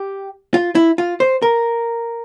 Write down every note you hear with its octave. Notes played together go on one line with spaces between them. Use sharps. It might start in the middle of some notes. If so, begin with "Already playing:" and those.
Already playing: G4
F4
E4
F4
C5
A#4